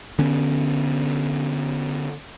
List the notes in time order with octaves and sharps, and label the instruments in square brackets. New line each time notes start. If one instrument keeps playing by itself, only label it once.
[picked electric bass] D3 B3 C#4